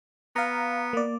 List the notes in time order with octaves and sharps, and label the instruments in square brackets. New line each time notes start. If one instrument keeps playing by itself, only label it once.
[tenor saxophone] B3 [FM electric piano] F5 A#5
[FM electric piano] A#3 D5